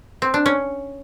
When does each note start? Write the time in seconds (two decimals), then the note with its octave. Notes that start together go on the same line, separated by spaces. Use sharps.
0.22 C4
0.34 D4
0.46 C#4